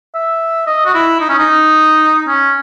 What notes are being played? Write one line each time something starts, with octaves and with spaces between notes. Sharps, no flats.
E5
D#5
F#4
E4
D#4
C#4
D#4
C#4